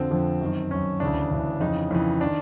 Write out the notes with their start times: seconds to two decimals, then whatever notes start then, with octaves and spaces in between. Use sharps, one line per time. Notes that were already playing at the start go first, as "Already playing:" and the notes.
Already playing: F2 D3 F3 C4
0.10 F2 D3 F3
0.41 F#2 D#3
0.71 F#2 D#3 C#4
1.00 D2 C#3 E3 D4
1.31 D2 C#3 E3
1.61 F2 C#3 E3 D#4
1.91 F2 C#3 E3
2.21 D#3 D4